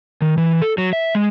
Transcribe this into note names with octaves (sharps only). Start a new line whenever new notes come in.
D#3
E3
A4
F#3
E5
G#3